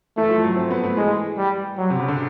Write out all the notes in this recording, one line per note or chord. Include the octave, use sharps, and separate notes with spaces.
E3 A3
F3
F#3
C4
B3
A3
E3 G#3
G3
F#3
C3
C#3
D3